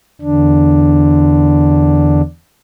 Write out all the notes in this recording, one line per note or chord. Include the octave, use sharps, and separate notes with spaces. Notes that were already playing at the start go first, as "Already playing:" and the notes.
E2 D3 D4